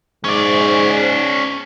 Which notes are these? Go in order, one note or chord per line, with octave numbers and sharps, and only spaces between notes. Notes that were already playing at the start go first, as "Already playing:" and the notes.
G#2 C#4 D5